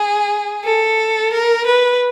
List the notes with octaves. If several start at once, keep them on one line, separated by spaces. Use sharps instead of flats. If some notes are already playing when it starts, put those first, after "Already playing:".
Already playing: G#4
A4
A#4
B4